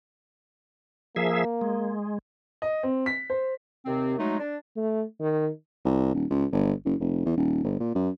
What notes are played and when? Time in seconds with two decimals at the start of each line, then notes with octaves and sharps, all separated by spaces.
1.16 F3 A#3 G#4 E5
1.61 G#3
2.62 D#5
2.83 C4
3.06 B6
3.30 C5
3.86 D#2 C3 C4
4.17 F#3 G#3 A3 D#4
4.40 D4
4.77 A3
5.20 D#3
5.85 C2
6.14 D#1
6.30 C#2
6.52 G1
6.85 F#1
7.00 F1
7.26 E2
7.37 D#1
7.64 G1
7.80 A#2
7.95 F#2